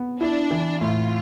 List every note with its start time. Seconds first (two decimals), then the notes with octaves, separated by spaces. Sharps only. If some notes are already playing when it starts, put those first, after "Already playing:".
Already playing: B3
0.20 D4 E4
0.51 E3
0.81 A2 F4